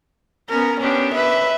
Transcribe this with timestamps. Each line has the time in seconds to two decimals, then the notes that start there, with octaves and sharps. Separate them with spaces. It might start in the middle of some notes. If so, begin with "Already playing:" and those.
0.49 B3 C#4 A#4
0.81 B3 C#4 D4 G4
1.14 B4 E5